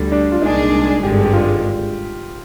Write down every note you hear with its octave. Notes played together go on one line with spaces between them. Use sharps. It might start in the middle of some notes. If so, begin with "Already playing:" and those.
Already playing: D2 D3 G3
D4
F4
C2 A#2 G#3 D4 D#4 G#4
G#1 G2 D3 G#3 G4
G4
F4